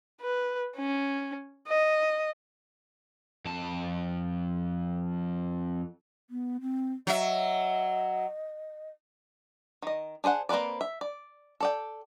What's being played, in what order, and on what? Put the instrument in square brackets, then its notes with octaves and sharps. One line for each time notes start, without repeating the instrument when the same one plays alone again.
[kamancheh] B4
C#4
D#5
[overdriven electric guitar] F2 A5
[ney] B3
C4
[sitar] F#3 E5 [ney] D#5
[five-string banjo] D#3 D#5
D4 G#4 C5 F#5
A#3 C4 A#4 B4 D5
E5
D5
A4 D5 G5